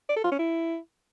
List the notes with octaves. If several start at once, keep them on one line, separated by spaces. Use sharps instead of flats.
D5
A4
F4
C#4
E4